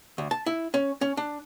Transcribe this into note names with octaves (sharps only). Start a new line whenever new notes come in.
D2
A5
E4
C#4
C#4
D4